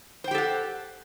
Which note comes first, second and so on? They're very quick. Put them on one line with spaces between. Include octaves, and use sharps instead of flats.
C5 G5 G4 A4 F#5